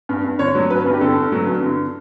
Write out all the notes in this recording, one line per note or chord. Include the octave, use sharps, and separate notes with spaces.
G2
G2
D3 C#5
F#3
G2 B4
G2
G4
D3 A4
G2
F#3
G2
D3